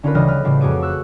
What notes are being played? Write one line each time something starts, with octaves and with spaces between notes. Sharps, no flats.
D3 C#4 D#4 F4 A#4 B4
D2 C#3 E3 G3 D#5 F6
B4 F6
A2 C#3 G3 A3 F4 G4
F2 A3 F#4 G#4 D6 D#7
C#6 E6 F#6